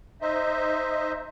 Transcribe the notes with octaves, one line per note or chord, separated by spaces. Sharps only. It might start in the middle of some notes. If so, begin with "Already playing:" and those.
D#4 C5 D#5 E5